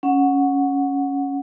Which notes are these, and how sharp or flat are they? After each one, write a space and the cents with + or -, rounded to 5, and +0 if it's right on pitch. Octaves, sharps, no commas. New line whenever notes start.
C#4 +0 F#5 -15